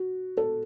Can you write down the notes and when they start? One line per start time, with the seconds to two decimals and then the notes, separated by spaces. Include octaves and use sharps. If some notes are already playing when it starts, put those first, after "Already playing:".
Already playing: F#4
0.37 A4